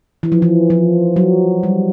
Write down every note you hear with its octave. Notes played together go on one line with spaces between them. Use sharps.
E3
F3
E3
F3
F#3
G3